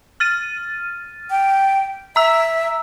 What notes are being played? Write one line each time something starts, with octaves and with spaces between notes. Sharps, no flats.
F6 A6 D#7
G5
E5 A#5 E6